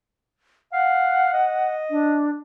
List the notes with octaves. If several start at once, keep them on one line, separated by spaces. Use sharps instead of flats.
F5 F#5
D#5
D4